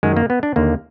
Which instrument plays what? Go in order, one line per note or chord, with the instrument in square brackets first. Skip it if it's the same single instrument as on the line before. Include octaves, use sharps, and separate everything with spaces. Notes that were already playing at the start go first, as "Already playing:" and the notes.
[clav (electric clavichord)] F#2 D#3 G#3
A#3
B3
D4
D#2 D3 A#3